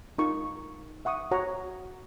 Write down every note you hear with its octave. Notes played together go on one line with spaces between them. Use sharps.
D#4 F4 A#4 C#6
E5 F#5 C#6 D#6
F#4 C#5 F#5 A#5